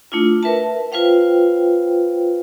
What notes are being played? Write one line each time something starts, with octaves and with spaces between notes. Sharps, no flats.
A3 D4 E4 F4
A#4 B4 E5 A5
F4 B4 C5 F5 G5